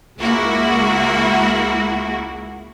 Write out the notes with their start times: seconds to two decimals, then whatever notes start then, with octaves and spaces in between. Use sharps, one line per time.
0.18 C#2 G#3 A#3 E4 F#4